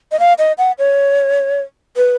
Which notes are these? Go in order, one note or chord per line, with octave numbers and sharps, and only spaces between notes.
D#5
F5
D#5
F#5
C#5
B4